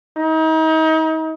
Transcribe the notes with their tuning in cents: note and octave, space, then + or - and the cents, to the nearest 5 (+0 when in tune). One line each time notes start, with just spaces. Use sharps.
D#4 +35